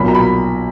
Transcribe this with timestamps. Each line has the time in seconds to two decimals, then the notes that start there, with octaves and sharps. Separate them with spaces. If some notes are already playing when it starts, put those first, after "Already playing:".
Already playing: B1 A#2 F#3 B5
0.08 A#5
0.15 B5